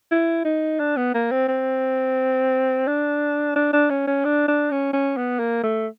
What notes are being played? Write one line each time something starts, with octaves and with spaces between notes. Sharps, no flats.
E4
D#4
D4
B3
A#3
C4
C4
D4
D4
D4
C#4
C#4
D4
D4
C#4
C#4
B3
A#3
A3